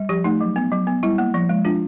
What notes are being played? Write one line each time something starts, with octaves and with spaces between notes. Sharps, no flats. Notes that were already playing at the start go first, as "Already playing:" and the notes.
Already playing: G3
F3 G4
A3 D#4
F#3
B3
F#3
B3
G3 E4
A#3
F3
G#3
D4 F4